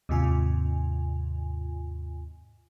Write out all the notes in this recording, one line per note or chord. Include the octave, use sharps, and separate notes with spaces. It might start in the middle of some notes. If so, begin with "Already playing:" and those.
D#2 G#2 C3 F4 G#5